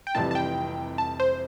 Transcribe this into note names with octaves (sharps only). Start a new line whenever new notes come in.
G5
F1 F2 C3 E3 G3 A5
A5
G5
A5
C5